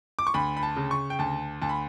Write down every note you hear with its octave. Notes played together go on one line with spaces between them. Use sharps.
D6
C#6
D2 B5
B5
A5
C#3
C#6
G5
D2 A5
D2 A5
B5